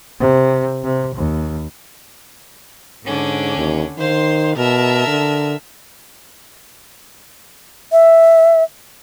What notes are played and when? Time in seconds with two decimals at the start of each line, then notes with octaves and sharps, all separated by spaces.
0.20 C3
0.85 C3
1.16 D#2
3.05 G#2 D3 C#4 D4
3.57 D#2
3.98 D#3 C5 F5 C6
4.57 B2 A#4 E5 A5
5.07 D3
7.92 E5